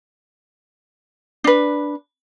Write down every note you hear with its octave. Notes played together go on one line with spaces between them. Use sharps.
D4 B4